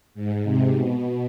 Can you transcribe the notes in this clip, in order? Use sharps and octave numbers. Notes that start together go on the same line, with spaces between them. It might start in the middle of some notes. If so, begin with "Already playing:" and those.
G#2
C3
B2